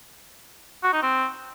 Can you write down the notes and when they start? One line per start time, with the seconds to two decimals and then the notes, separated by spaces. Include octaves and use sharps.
0.84 F#4
0.93 D#4
1.02 C4